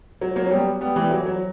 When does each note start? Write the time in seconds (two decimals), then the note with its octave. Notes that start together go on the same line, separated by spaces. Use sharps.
0.21 F#3
0.36 F#3 A#3
0.46 C#4
0.51 G3 B3
0.81 G3 B3
0.96 E3 G3
1.11 F#3
1.26 F#3